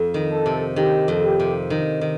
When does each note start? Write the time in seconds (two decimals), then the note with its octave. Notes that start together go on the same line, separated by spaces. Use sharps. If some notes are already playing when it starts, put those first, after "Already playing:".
Already playing: F2
0.14 D#3
0.31 A4
0.46 C3
0.76 D#3 G4
1.08 F2
1.23 G4
1.40 C3
1.70 D#3
2.01 D#3